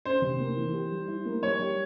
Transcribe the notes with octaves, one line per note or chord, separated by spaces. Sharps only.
C#4 C5
C3
A#3
E3
G4
G3
E4
A#3
G3 C#5
G3